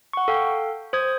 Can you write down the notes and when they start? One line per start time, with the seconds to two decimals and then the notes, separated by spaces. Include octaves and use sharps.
0.13 F#5 C#6
0.28 A4 F5 G5
0.93 C5 D#6 G#6